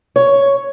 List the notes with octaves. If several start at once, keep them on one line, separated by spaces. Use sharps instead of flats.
C#5